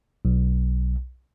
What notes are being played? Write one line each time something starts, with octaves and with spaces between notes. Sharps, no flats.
B1